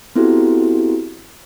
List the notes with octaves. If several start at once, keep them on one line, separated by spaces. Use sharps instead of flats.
B3 C4 E4 F#4 G4 A4